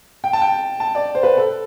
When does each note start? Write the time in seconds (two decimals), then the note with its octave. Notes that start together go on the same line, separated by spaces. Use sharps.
0.24 G5
0.33 A5
0.42 G5
0.80 A5
0.95 D5
1.15 C5
1.23 B4
1.37 A4